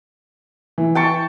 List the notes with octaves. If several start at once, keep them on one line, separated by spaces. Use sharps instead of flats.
E3
G5 A5 C#6